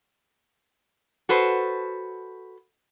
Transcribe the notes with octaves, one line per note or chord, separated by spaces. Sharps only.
F#4 A4 B4 C5